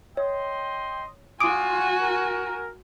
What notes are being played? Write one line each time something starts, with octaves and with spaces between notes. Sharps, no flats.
C#5 D#5 G5 C6
D4 F4 F#4 G#5 D6 D#6 D7
A#4